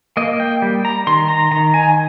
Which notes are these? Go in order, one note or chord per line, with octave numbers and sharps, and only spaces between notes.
A#3 D#5
G5
G3
A#5
D#3 C6
A#5
D#3 A#5
G#5